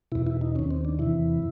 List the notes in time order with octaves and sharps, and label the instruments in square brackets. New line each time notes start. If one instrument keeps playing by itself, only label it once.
[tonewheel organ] E2 B2 E4
E4
D#4
D#2 D#3 C#4
C4
D4
E2 C3 E3 E4